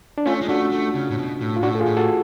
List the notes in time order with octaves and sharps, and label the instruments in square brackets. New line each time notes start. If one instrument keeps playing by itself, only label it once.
[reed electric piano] D4
[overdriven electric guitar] A3 [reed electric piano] C#4 F4
[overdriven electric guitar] G#3
[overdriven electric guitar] A3 [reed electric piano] D4 F#4
[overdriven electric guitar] A3
C#3
A2
B2
A2
[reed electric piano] F4
[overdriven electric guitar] A2 [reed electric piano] D4 F#4
[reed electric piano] A4
F4 G#4
[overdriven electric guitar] A2
[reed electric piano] F#4 A4